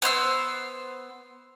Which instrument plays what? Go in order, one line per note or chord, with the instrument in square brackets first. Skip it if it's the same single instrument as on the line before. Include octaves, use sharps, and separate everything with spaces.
[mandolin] B3 C5 C6 E6